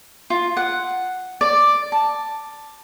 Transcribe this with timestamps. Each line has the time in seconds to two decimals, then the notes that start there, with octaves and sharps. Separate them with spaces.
0.30 F4
0.57 F#5
1.41 D5
1.92 A5